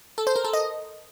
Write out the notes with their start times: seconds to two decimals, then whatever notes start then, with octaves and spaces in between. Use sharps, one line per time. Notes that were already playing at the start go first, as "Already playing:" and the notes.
0.18 A4
0.27 C5
0.36 A#4
0.45 A4
0.53 D#5